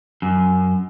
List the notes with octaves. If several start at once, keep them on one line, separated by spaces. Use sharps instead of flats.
F#2